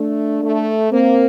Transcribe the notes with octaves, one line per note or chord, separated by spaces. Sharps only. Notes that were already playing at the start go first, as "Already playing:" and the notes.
Already playing: A3 D4
A3
A#3 C4